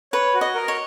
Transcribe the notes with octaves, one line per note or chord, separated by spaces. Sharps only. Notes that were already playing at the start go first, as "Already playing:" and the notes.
B4 C#5
F#4
D#5
A#4
C#5